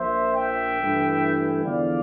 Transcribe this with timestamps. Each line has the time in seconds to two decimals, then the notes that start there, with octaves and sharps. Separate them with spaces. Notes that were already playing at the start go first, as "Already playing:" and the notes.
Already playing: A#1 A#2 F3 A#3 C5 E5
0.35 E5 G5
0.77 G2 E3 A3 E4
1.63 E2 D3 F3 D5 F5